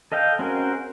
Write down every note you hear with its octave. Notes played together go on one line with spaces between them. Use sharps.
A4 D#5 F5 G5
C4 C#4 F#4 G#4 A#4